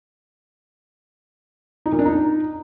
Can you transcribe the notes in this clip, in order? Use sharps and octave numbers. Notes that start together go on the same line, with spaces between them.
D#4
A#2
D4
D#4